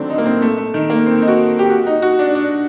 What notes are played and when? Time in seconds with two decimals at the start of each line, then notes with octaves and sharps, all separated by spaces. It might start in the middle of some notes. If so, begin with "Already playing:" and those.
Already playing: D3 D#3 F#3 A3 C4 D4
0.10 D#4
0.18 A#3
0.26 C4
0.42 A3
0.58 A3
0.74 D#3
0.90 A#3
1.06 C4
1.22 D#4
1.28 F#4
1.59 G4
1.70 F#4
1.87 D#4
2.02 F#4
2.19 D4
2.35 D4